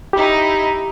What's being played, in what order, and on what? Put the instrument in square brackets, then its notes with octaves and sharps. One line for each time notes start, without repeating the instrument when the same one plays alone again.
[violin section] D#4 E4 [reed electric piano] G4